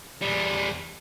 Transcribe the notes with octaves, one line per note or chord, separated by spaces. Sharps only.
E2 G3